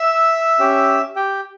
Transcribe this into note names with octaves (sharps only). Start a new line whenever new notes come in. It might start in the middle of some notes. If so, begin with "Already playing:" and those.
Already playing: E5 E6
C#4 G4
G4 G5